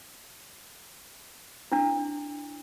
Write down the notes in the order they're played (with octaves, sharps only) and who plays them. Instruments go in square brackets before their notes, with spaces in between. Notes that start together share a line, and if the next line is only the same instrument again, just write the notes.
[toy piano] D4 E4